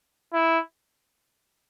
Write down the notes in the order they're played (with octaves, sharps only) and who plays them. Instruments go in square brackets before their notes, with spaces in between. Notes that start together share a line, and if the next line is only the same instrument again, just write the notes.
[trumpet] E4